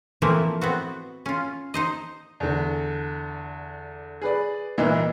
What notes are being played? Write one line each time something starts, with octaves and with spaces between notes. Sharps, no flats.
E3 F3 A3 A#3 C4 E5
B3 C4 F#4
C#4 F4
D#4 C5 D#5
E2 D3
G#4 B4 D5
C2 A#2 E3 D#4 E4 B4